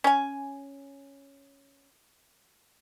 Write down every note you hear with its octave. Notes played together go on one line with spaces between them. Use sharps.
C#4 G#5